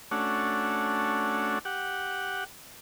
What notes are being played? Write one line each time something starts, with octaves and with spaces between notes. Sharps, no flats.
A3 C#4 D4 F#4
G4 F#5